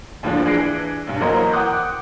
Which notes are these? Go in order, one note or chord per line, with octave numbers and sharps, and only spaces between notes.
D#2 A2 D3 F3 D4
E3 D4 G#4 A#6 C7 D7
B1 G2
E3 F#3 A#3 A#4 C5 D#5
F#5 G5 D6 D#6 F#6 G6